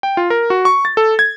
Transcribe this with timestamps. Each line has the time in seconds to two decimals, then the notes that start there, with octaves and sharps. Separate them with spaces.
0.03 G5
0.17 F4
0.30 A#4
0.50 F#4
0.65 C#6
0.85 A6
0.97 A4
1.19 G#6